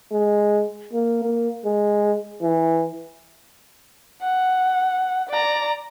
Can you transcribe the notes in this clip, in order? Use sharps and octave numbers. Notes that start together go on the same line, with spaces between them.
G#3
A#3
A#3
G#3
E3
F#5
D5 A#5